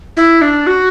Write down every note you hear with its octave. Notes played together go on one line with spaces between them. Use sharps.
E4
D4
F#4